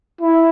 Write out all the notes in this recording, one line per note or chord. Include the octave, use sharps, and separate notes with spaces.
E4